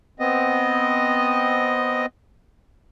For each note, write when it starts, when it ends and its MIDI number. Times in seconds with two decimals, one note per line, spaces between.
0.20 2.06 59
0.20 2.06 60
0.20 2.06 75